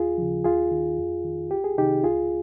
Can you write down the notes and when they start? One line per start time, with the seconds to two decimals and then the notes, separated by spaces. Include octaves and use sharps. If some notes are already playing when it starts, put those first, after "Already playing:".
Already playing: D#2 F4 G#4
0.18 C#3 F3
0.44 D#2 F4 G#4
0.71 D#3
0.98 F2
1.25 D#3
1.51 C2 G4
1.64 G#4
1.78 C3 D#3 D#4 G4
2.03 C#2 F4 G#4